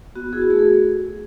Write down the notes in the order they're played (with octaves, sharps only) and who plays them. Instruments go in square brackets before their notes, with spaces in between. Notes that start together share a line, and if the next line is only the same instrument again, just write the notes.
[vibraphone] B3 F#4
E4 G#4
F#4
A3 G#4
A4